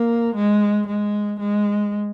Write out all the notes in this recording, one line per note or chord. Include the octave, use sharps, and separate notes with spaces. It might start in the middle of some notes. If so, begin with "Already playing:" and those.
Already playing: A#3
G#3
G#3
G#3